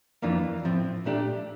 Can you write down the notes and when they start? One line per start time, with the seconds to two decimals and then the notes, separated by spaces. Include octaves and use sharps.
0.22 F2 E3 A#3 D4 F4
0.64 A2 F3 C4
1.05 A#2 A3 D4 G4